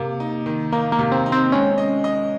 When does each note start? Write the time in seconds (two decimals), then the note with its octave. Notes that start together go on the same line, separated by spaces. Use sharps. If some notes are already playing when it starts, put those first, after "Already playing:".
Already playing: C3 A#3
0.20 D#4
0.46 D#3
0.72 A#3 D#4
0.92 A#3
0.99 C3
1.12 C4
1.26 D#4
1.32 C4
1.52 G#3 C#4
1.78 D#5
2.04 D#5